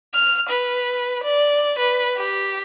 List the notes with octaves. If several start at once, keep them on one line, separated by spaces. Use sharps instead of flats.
F6
B4
D5
B4
G4